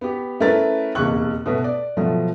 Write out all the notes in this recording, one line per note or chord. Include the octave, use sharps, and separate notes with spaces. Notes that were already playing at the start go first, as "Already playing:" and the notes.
B3 G4
A3 C#4 E4 A#4 B4 A6
F1 B1 E2 A#3 C#6 F#6
B2 A3 B4
D5
B2 F3 F#3 A3